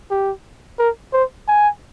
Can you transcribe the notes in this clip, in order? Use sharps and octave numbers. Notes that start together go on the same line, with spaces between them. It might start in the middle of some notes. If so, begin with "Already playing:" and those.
G4
A#4
C5
G#5